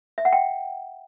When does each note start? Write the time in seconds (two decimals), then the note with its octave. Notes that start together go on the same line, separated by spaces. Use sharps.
0.18 E5
0.25 F#5
0.33 G5